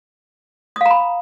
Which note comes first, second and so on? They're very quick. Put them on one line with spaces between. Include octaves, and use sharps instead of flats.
D#6 F5 A#5 B5